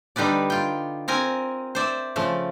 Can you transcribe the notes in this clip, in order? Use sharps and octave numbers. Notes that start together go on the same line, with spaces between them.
D3 G3 D#4 B4 D5
F4 G5
C4 A#4 G#5
C5 D5 E5
C#3 F3 A3